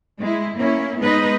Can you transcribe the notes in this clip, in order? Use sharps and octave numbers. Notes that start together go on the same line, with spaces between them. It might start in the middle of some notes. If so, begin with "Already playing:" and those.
G#3 E4
A#3 C#4 E4
G#3 B3 D#4 B4 D#5